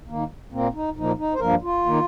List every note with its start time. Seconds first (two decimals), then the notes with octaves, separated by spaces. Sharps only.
0.09 D#2 D#3 A#3
0.52 A#2 A#3 C4
0.74 D#4
0.96 A#2 F3 A#3 D#4
1.19 D#4
1.34 C5
1.39 G2 F3 A#3 A#4
1.62 F4
1.85 D#3 A#3